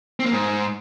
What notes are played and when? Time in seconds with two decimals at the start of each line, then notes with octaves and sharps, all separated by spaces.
0.20 C4
0.26 A#3
0.32 G#2